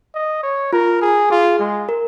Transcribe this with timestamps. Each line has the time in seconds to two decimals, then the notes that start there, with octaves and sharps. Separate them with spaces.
0.14 D#5
0.43 C#5
0.73 F4 A#4
1.02 G#4
1.30 F4 G#4
1.59 G#3
1.89 A#4